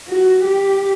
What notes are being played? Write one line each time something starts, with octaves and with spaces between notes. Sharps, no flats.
F#4
G4